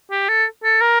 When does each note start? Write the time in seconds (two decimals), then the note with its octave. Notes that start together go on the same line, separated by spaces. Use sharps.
0.11 G4
0.29 A4
0.64 A4
0.81 A#4